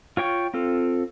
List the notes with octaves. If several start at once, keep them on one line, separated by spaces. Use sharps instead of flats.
F4 C#5 G5 C#6
C4 F4 A4